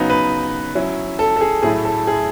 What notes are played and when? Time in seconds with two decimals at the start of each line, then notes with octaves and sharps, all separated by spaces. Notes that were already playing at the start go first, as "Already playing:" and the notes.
Already playing: C#3 F#3 B3 D#4
0.10 B4
0.75 F#3 C#4 E4
1.19 A4
1.36 A4
1.41 G#4
1.62 A2 F#3 A3 E4 G#4
1.85 A4
2.07 G#4